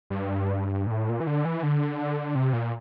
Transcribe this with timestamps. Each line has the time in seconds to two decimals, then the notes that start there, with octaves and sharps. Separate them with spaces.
0.10 G2
0.87 A#2
0.91 A2
1.09 A#2
1.20 E3
1.27 D3
1.45 E3
1.63 D3
2.35 C3
2.53 A#2